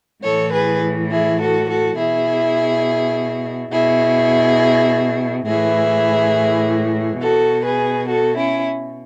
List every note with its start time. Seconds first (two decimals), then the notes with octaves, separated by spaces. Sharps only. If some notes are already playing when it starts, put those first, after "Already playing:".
0.23 A2 E3 A4 C#5
0.53 G#4 B4
1.11 E4 G#4
1.40 F#4 A4
1.69 F#4 A4
1.97 B2 E4 G#4
3.72 B2 E4 G#4
5.47 A2 E3 E4 G#4
7.21 B2 F#4 A4
7.64 G#4 B4
8.08 F#4 A4
8.37 C#4 E4